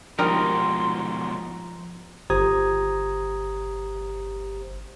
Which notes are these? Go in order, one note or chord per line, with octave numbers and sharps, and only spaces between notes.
G#2 B2 F3 G3 D#4 A#4 A#5 C6
G1 G4 C5 A#5 D#6 G#6